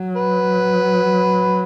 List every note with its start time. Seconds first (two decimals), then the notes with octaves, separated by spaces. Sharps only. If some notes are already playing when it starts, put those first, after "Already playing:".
Already playing: F#3
0.16 B4